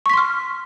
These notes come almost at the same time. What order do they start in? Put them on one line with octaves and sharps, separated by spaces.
C#6 B6 C6 F6